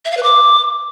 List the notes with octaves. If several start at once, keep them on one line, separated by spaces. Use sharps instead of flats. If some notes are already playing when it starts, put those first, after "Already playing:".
E5
F5
B4
D6